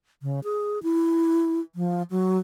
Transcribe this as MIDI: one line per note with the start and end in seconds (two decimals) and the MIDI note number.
0.22 0.40 49
0.44 0.79 68
0.83 1.60 64
1.75 2.02 53
2.10 2.39 54